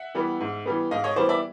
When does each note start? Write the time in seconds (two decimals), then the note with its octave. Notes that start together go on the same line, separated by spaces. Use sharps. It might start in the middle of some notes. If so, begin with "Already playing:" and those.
Already playing: E5 F#5
0.15 E3 G3 B3
0.40 G#2
0.66 E3 G3 B3
0.91 G#2 D#5 F5
1.04 C#5 D#5
1.16 E3 G3 B3 C5 D5
1.29 D5 E5